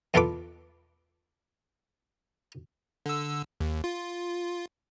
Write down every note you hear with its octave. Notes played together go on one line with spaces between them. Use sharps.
E2 F4 A4 B4 D6
D3 E6
D#2
F4